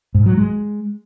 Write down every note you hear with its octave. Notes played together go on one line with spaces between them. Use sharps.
G#2
F#3
G#3